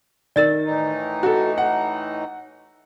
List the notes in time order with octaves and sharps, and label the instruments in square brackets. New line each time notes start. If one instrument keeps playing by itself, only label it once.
[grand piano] D#3 A6 [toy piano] A#4 D5
[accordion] A2 E3 D#4
[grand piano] F#4 A4
F#5